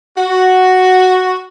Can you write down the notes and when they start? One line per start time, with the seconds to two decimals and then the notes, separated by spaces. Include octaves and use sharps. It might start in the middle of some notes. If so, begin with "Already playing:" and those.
0.17 F#4